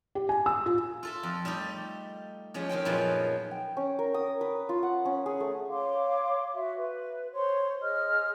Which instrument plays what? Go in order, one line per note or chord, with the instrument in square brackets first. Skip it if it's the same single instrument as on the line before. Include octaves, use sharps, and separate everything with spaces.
[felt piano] G4
G#5
E6
F4
[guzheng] F4 A4 E5
F2
G3 A3 D#4 G4
F3 G#3 C#4
D#3 C4 C#4 G5
F#2 A#2 F3 F#3 G#3 B3
[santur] G5
C#4
A#4
D#6
B4
F4
F#5
C#4
G#4
A3
[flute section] C#5 F5 C6 D6
F#4 E5
B4
C5 C#5 C6
G#4 D#5 F6